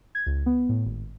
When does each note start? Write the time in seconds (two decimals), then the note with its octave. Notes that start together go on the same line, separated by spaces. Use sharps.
0.15 G#6
0.26 C#2
0.46 B3
0.69 A2
0.85 G#1